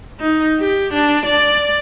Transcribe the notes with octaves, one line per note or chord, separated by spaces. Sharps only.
D#4
G4
D4
D5